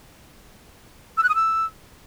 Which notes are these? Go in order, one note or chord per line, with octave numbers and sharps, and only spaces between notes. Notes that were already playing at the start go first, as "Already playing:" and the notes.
E6
F#6
D#6
E6